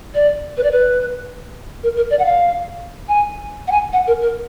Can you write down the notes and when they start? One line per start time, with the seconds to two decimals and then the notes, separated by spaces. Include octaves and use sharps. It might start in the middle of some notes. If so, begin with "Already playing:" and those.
0.15 D5
0.57 B4
0.63 D5
0.71 B4
1.83 A#4
1.96 A#4
2.10 D5
2.19 F#5
2.25 F5
3.08 G#5
3.67 F#5
3.71 G#5
3.93 F#5
4.07 A#4
4.21 A#4